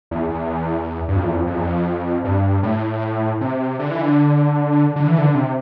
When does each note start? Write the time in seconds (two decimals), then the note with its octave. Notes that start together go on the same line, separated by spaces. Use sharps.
0.11 E2
0.30 E2
1.08 G2
1.16 F2
1.25 E2
1.33 F2
1.47 F2
1.55 E2
1.62 F2
2.25 G2
2.63 A2
3.41 C3
3.79 D3
3.91 E3
4.01 D3
4.96 D3
5.07 E3
5.18 D3
5.35 C3